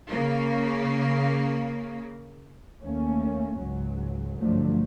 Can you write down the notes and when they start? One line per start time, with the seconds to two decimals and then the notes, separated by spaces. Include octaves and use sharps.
0.10 C#3 A#3
2.82 D#2 A3 A#3 C#4
3.57 C#2 G#2 F#3
4.38 B1 G2 D3 F3 F#3 A3